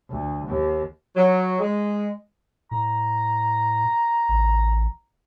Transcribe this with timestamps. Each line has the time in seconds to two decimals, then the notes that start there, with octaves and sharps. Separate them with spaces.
0.10 D2
0.48 D#2
1.16 F#3
1.59 G#3
2.71 A2 A#5
4.29 A1